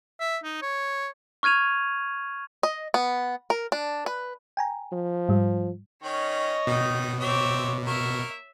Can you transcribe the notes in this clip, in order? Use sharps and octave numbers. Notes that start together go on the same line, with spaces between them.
E5
D#4
C#5
C#6 F6 G#6 D#7 F7
D#5
B3
A#4
D4
B4
G5 G#5 A#5
F3
G#2 G3
D#3 C#4 C#5 D#5
B2 D#3 D#4
C4 C#5 E5 D6
A#3 A#4 E5 C#6